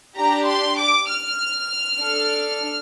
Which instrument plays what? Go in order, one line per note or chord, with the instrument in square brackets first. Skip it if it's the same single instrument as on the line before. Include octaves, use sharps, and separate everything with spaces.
[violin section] D4 G4 A#5
C6
D6
F6
D4 A4